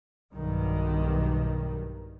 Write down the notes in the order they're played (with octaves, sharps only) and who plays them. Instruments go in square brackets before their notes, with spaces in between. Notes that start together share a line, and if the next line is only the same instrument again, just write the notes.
[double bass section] B1 G2 D#3